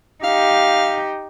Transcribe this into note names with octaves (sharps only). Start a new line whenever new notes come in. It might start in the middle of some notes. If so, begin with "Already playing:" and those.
D#4 G4 F5